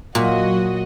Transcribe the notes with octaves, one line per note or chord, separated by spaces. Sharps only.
A#2 F#3 F#4 D#5